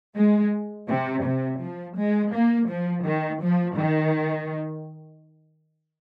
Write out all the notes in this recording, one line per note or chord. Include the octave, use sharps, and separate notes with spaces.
G#3
C3
C3
F3
G#3
A#3
F3
D#3
F3
D#3